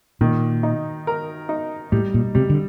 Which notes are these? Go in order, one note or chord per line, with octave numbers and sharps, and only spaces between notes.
A#2 D#3
D#4
A#4
D#4
A2 G3
A#2
C3 G3
D3